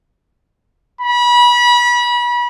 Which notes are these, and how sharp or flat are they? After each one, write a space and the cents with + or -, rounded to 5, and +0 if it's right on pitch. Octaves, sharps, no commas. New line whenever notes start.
B5 -30